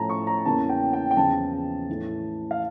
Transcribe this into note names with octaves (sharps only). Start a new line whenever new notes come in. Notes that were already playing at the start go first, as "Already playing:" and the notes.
Already playing: A2 F3 C#4 A5 A#5
C#6
A#5
E2 C#3 E3 A#3 C#4 A5
G5
G5
G5
E2 C#3 F3 A5
A2 E3 A3
F5